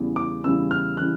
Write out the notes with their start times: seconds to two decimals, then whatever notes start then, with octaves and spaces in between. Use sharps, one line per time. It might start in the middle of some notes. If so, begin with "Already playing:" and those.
Already playing: E2 C#3 E3 G3
0.16 D6
0.43 E2 C#3 E3 G3 E6
0.71 F6
0.97 C#3 E3 G3 F#6